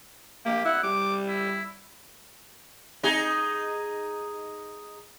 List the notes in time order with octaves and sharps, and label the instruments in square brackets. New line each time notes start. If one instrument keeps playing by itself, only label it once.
[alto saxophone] A#3 [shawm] G4
[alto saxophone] E4 [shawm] F#5
[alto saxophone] G3 [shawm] D6
[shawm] E4
[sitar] D#4 G#4